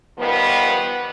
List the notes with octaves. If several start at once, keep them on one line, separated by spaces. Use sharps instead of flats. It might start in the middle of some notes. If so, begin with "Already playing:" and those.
D#3 F3 G3 B3